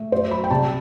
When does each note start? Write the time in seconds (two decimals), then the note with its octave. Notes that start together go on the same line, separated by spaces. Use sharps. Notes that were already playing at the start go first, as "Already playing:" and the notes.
Already playing: A3
0.12 F#2 C5
0.31 F#3 B5
0.44 G5
0.51 C2 A5